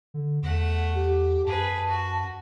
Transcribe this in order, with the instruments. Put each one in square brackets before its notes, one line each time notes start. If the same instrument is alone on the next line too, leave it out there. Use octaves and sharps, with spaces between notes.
[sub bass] D3
[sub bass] E2 [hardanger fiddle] A3 F#5
[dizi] G4
[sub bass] F#2 [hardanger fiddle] G#4 B4 [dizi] A5
[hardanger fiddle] F#4